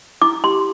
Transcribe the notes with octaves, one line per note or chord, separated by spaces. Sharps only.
E4 D6
G4 C6